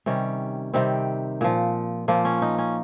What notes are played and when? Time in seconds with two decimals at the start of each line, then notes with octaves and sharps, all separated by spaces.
0.06 C3 D#3 G3 C#4
0.73 C3 D#3 G3 C4
1.41 A#2 F3
2.08 A#2 F3 A#3
2.25 C#4
2.42 D#4
2.58 C#4